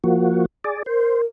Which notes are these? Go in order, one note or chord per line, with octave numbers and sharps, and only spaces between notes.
F3 A#3 F#4
G#4 D5
A#4 C5